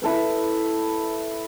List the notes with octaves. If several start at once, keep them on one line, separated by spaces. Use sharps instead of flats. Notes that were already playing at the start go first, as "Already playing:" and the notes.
E4 A4 B4